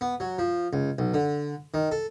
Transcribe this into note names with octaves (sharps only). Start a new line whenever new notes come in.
B3
F#3
F3
C#2
B1
D3
D#3
A4